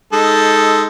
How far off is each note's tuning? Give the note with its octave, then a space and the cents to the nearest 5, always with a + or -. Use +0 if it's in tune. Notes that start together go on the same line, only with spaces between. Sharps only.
G#3 +0 D#4 +15 A4 +0